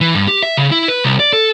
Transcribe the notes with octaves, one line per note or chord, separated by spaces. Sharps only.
E3
G2
G4
E5
C#3
E4
B4
C2
D5
A4